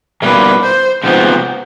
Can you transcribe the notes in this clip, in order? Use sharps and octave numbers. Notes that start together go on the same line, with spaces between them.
B2 G3 A#3 B4
C5
C3 F3 G#3 B3 D#4 C5